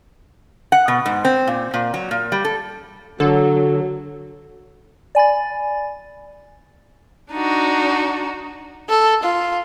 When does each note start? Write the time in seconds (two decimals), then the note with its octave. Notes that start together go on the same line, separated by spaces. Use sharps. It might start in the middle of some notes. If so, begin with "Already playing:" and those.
0.72 F#5
0.88 B2
1.06 G#2
1.25 C4
1.47 A#2
1.74 A#2
1.94 F#3
2.11 A#2
2.32 G3
2.45 A4
3.20 D3 F#3 A4
5.15 D5 G#5 B5 A6
7.32 D4 D#4 F#4
8.89 A4
9.24 F4